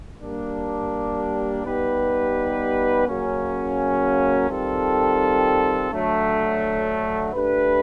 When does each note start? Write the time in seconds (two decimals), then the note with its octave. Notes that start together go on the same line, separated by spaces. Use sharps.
0.21 G3 A#3 D4
1.64 G3 B3 D#4 G4 B4
3.06 C#3 F#3 A#3 C#4
4.49 D#3 G3 C4 F4 A4
5.91 D3 F#3 A3
7.33 A3 D4 G4 B4